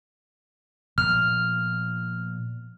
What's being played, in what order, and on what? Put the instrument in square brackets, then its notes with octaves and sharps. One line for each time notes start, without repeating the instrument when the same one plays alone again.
[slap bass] A#2 F3 B3 [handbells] F6